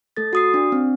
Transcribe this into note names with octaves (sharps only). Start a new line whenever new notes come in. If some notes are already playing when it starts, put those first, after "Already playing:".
A3 A4 A6
F#4 D#6 C7
D4
C4